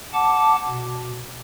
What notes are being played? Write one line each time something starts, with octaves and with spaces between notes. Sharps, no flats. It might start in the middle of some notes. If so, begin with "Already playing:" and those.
F#5 A5 D6
B2